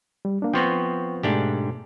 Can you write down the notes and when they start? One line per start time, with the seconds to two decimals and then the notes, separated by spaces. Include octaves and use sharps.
0.25 G3
0.42 A#3 D4
0.53 F3 B3 C4 G5 C6 C#6
1.23 G#2 B2 A3 D4 G4